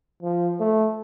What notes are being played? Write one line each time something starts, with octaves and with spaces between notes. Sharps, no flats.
F3
A3